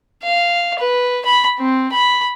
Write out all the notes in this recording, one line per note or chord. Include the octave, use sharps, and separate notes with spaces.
F5
B4
B5
C4
B5